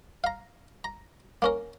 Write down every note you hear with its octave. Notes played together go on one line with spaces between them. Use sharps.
F5 A#5
A#5
A#3 C#4 A#4